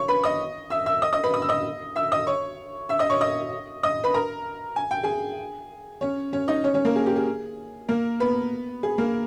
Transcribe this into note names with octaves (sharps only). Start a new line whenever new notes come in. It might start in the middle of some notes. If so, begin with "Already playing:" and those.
Already playing: C#5 C#6
B4 B5
D#5 D#6
E5 E6
E5 E6
D#5 D#6
D#5 D#6
B4 B5
D#6
E6
D#5 D#6
E5 E6
D#5 D#6
C#5 C#6
E5 E6
D#5 D#6
C#5 C#6
D#5 D#6
D#5 D#6
B4 B5
A#4 A#5
G#5
G5
G#4 G#5
C#4 C#5
C#4 C#5
D#4 D#5
C#4 C#5
C#4 C#5
A#3 A#4
G#4
G4
G#4
A#3 A#4
B3 B4
G#4
A#3 A#4